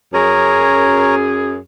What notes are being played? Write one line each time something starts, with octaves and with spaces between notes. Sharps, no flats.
F#2 G#4 A#4 C#5 A#5